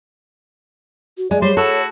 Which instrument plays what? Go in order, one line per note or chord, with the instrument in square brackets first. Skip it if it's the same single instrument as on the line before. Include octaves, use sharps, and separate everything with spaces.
[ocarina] F#4
[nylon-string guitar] G#3 [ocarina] D5
[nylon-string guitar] G3 [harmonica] C5 C6 [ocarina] C#5
[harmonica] E4 F#4 [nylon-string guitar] A4